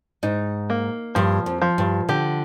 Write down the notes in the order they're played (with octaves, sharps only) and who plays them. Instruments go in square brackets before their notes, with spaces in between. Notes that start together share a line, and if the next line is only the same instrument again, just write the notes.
[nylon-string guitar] G#2 [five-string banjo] D#4
[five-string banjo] A#3
[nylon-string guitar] G2 [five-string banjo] F3
[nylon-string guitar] F2
[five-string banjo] F3
[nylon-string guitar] G2
[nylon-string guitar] D3 [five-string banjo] G4